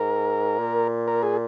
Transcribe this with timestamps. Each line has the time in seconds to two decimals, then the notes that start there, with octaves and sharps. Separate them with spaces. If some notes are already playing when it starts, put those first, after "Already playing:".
Already playing: G#2 A#4
0.58 A#2
1.08 A#4
1.23 G#4